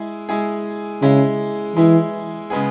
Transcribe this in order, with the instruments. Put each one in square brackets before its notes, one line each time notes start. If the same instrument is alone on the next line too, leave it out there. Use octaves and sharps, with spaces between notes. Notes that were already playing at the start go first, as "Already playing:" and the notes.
Already playing: [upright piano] G#3 E4 G#4
G#3 E4 G#4
[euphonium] C#3 [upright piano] G#3 E4 G#4
[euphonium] E3 [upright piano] G#3 E4 G#4
[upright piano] C#3 G#3 B3 G#4